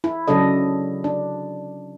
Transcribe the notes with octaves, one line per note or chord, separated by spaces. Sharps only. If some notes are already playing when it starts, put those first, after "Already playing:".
E4
C#3 F#3 D4 A4 D#5
D4